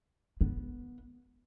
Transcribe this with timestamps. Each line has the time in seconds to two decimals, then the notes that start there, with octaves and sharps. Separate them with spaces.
0.41 B3